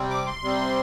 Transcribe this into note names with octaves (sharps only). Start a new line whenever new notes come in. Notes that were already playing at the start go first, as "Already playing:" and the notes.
Already playing: C3 G3 C4
D6
C6
C3 G3 C4